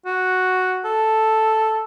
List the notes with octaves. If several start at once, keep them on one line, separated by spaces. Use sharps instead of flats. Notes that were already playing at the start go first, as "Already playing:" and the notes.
F#4
A4